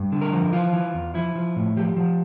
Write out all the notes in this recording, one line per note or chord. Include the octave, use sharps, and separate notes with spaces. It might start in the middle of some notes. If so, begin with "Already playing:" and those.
Already playing: G2
D3
A#4
F3
E3 F4
E3
E2
F3 E4
F3
A2
F3 G4
F3